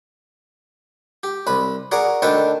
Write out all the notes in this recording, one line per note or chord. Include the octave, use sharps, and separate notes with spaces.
G4
C2 B4 B5
F#4 G#4 A#4 D5
D2 D#3 D4 A4 B4 G5